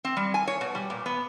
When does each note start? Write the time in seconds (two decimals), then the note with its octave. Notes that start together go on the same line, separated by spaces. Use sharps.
0.05 C4
0.17 G3
0.34 G#5
0.47 C#5
0.61 B2
0.75 G3
0.90 A#2
1.06 B3